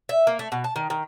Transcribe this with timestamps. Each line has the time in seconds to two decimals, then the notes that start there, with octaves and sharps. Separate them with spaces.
0.09 E5
0.27 A#3
0.39 A3
0.52 B2
0.64 A5
0.76 D#3
0.90 D#3